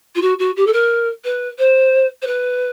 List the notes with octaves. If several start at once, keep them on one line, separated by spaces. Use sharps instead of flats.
F4
F#4
F#4
G4
A4
A#4
B4
C5
C5
B4